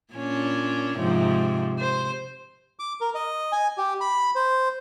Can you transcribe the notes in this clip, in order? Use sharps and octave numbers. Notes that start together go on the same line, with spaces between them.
A#2 C#4 D4
G#2 C3 F3
C5
D6
A#4
D#5
G#5
G4
B5
C5